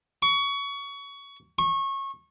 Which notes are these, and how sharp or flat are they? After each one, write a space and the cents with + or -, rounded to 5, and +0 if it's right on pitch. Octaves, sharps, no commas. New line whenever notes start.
C#6 +25
C#6 -25